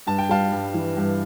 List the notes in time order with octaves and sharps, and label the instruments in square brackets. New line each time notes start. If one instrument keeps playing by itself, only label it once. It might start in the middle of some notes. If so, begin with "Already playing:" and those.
[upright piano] G2 A5
G5
G3 F5 A5
G2
E3
G2